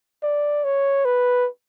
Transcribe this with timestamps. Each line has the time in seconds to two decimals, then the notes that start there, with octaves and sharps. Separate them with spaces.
0.23 D5
0.64 C#5
1.05 B4